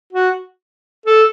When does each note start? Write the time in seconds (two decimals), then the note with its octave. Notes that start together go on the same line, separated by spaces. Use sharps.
0.13 F#4
1.06 A4